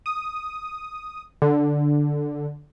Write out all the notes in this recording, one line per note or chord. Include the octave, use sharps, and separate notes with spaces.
D#6
D3